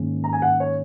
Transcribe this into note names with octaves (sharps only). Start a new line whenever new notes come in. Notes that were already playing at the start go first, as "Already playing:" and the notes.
Already playing: G#2 D#3 A#3 C#4
A#5
G#5
F#5
C#5